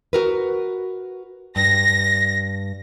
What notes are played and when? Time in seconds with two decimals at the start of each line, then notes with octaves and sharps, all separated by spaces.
0.13 F#4 A#4 B4
1.56 G2 A#6